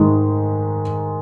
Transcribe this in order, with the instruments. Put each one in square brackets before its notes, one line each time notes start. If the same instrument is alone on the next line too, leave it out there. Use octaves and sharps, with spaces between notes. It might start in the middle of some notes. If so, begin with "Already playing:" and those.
Already playing: [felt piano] G#2 D#3 G#3